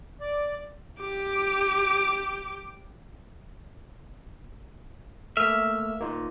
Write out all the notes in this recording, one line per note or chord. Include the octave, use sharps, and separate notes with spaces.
D5
G4 D6
A3 A#3 E5 F6
A#3 D#4 F4